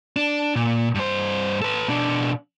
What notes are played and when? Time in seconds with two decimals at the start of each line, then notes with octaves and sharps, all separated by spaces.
0.16 D4
0.56 A#2
0.95 G2 C5
1.62 A4 B4
1.88 B2 D4